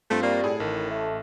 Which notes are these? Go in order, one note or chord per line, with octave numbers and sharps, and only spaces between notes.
G2 A3 C4 F4
G3 A#3
A2 G#4
A1 D#3
A3